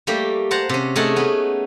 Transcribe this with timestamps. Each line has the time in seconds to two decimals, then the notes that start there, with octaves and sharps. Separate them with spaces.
0.07 G3 A3 A#3 G4
0.51 C5 F#5 A5 A#5
0.69 C3 C#4
0.96 A3 D#4 G#4 A#4 F#5 A5
1.16 B3 C#4